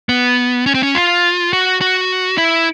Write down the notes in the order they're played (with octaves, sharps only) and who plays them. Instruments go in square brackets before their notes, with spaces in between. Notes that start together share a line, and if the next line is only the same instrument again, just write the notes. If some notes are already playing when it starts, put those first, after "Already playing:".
[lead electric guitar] B3
C#4
C4
C#4
F4
F#4
F#4
E4